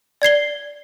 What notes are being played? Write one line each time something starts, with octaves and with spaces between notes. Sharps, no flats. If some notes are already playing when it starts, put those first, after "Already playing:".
D5 G#6 C7 G7